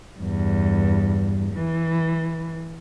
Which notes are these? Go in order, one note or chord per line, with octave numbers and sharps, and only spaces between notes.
E2 G2
E3